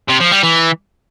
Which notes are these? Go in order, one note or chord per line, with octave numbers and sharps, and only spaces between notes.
C3
F3
G3
E3